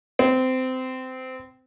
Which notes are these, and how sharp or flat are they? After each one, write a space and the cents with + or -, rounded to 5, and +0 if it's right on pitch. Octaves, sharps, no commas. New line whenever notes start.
C4 -20